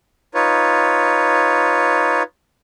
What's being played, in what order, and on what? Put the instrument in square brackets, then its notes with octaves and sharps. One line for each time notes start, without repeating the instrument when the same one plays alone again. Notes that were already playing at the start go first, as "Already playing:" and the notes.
[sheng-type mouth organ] D#4 F4 B4 C#5